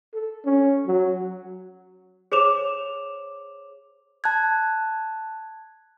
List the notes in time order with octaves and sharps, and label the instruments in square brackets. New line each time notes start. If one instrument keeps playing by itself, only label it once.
[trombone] A4
C#4
F#3
[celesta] G#4 C5 C#5 D6 E7 F7
[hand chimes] A5 F#6 G#6